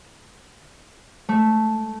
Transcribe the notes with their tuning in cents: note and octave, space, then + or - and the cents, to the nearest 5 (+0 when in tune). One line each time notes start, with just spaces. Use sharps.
A3 -5